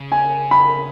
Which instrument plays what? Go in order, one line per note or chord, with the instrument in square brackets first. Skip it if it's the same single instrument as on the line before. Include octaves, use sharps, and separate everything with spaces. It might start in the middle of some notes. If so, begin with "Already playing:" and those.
Already playing: [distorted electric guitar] C#3
[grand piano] G#5
B5